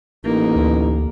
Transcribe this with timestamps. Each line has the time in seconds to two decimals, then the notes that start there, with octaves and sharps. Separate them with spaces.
0.25 A1 A#3 D#4
0.55 D2